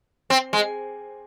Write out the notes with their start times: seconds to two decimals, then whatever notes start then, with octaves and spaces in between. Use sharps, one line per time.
0.30 C4
0.53 G#3